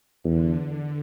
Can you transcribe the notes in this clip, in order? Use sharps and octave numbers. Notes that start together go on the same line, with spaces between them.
E2 D3